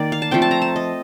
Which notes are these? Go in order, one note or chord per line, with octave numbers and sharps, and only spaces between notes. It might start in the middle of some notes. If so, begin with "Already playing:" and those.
Already playing: D#3 A#3 D5
F5
A5
F3 A3 C4 G5
A5
A#5
A5
D#5